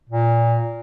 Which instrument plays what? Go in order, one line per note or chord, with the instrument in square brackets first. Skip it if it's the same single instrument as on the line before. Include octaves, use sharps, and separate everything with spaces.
[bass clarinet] A#2